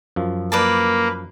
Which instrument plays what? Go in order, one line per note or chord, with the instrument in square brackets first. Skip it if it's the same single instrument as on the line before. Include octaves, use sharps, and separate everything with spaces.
[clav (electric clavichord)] F#2 F3
[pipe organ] A#3 [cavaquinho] B4 D5 A5